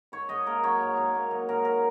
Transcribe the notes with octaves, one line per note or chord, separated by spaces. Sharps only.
G#2 C#5
G#2 D#5
A#3 A#4
F#3 C#5
G#2
G#2
A#3
F#3
G#2 A#4
A#4